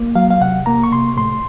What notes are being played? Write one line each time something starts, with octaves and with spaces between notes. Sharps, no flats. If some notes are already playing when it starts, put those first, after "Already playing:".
Already playing: A#3
F#3 F5
F5
C3 F#5
A#3 A#5
C#6
C3 C6
A2 C6